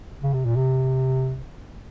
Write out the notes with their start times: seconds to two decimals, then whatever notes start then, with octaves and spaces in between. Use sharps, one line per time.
0.23 C#3
0.34 C3
0.45 A#2
0.56 C3